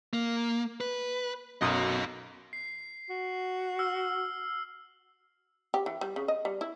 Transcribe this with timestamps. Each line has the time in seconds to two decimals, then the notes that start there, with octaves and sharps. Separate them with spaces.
0.13 A#3
0.81 B4
1.61 B1 F#2 F#4 D#5 D#6
2.53 C7
3.10 F#4
3.79 E6 F6
5.74 G4
5.86 E3
6.01 G3
6.16 C#3
6.28 D#5
6.45 G3
6.61 E4